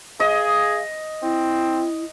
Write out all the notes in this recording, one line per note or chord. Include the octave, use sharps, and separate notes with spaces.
G#4 D#5 F5
C4 E4